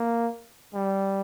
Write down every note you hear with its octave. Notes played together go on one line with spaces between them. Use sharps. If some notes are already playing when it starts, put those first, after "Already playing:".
Already playing: A#3
G3